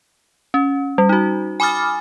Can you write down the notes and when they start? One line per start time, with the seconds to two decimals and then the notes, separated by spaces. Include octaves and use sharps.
0.54 C#4
0.98 G3
1.09 D#4 F#4
1.60 G#5 B5 D6 D#6 F6 A6